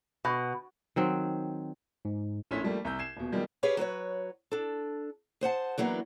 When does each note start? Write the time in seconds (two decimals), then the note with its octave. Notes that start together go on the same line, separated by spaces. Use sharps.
0.25 B2
0.96 D#3 F#3 C4
2.05 G#2
2.51 A#1 A2 C#4 E4 A4 B6
2.63 F3 G3 A3 A#3
2.85 C2 A#5 E6 G6
2.99 G#6 C7 E7
3.17 D#1 B2
3.32 B2 D#3 F3 G3 G#3
3.63 G4 G#4 B4 C#5 F5
3.77 F#3 F#4 B4 C#5
4.52 D4 A4
5.41 G#4 C5 F#5 A5
5.78 E3 F#3 A#3 B3 D4